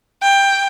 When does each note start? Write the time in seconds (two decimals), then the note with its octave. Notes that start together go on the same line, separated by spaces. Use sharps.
0.22 G5